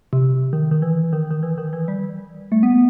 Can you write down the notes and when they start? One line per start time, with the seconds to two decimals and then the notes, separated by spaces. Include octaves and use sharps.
0.13 C3
0.53 D#3
0.71 D#3
0.82 E3
1.13 D#3
1.31 D#3
1.43 E3
1.58 D#3
1.73 E3
1.88 G3
2.52 A3
2.63 B3